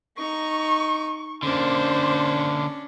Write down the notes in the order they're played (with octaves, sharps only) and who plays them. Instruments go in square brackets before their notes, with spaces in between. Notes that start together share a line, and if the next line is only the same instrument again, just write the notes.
[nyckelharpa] D#4 A#5 [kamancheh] C#6
[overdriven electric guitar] D3 A#3 [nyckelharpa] C#4 D4 [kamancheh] C5